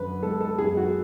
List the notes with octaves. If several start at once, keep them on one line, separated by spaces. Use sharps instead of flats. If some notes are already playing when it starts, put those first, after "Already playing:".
Already playing: F#2 D3 B4
G#3 A4
A4
F#2 G#4
F#4